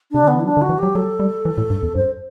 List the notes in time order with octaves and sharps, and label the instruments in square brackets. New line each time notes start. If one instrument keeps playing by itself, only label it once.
[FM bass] C3 [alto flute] D4
[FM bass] D3 [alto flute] B3
[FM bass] E3
[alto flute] E4
[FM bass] F#3 [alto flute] D4
[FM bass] D3
[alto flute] F#4
[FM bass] E3
[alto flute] G4
[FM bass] F#3
[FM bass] F#3 [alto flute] A4
[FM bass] G3
E3
A2
G2
E2
[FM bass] F#2 [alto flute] C5